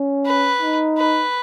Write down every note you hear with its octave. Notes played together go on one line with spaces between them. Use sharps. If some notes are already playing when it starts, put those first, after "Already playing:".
Already playing: C#4
B4
D#4
B4